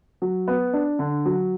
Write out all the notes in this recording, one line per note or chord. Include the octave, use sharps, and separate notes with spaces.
F#3
B3
D4
D3
F#3